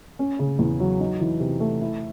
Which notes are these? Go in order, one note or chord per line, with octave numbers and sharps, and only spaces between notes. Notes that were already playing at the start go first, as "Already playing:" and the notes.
C#4
C#3
E2
F#3
D#4
E3
C3
A3
E4